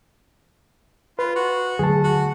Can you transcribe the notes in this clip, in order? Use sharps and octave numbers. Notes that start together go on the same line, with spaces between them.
F4 B4
F#4
D3 F#3 A3 G#4 A5
F#4